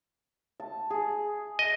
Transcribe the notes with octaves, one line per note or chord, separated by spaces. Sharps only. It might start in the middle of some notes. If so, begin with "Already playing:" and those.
A5
G#4
D#5